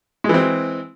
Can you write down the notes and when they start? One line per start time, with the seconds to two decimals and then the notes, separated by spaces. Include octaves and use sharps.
0.24 G#3
0.29 E3
0.34 C4